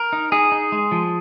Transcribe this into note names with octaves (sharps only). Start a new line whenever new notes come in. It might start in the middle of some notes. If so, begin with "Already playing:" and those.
Already playing: A#4
D#4
D#4 G#4
D#4
G#3
F3